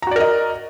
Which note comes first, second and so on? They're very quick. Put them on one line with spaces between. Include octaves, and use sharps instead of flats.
A#5 F#4 D5 A#4 D#5